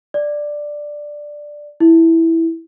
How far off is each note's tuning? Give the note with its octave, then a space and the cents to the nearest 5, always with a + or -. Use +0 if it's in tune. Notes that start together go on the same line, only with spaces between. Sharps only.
D5 +5
E4 -5